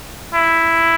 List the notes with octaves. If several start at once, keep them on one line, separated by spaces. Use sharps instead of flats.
E4